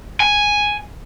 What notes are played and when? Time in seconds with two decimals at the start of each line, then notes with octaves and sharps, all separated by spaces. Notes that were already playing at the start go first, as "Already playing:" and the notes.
0.20 G#5